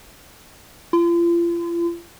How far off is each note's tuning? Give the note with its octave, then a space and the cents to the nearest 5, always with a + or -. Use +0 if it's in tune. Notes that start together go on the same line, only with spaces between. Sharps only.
F4 -40